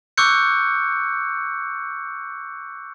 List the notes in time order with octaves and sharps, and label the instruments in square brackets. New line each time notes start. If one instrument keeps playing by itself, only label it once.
[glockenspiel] C#6 D6 E6 F#6 G6 C#7